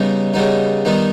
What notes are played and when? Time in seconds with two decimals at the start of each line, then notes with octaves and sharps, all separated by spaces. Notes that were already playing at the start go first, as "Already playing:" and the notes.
Already playing: C#3 G3 B3 D#4
0.34 C#3 G3 B3 D#4
0.85 D#3 G3 B3 D#4